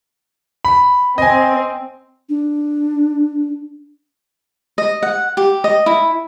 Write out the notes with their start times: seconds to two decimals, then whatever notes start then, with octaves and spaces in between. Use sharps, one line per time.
0.65 B5
1.18 C4 D#5 G#5
2.29 D4
4.78 D#5
5.03 F#5
5.37 G4
5.64 D#5
5.86 E4